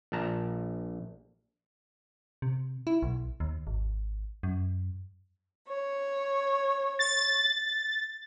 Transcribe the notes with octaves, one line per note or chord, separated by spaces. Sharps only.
A#1 A5 A#5
C3
E4
B1
D#2
G#1
F#2
C#5
A6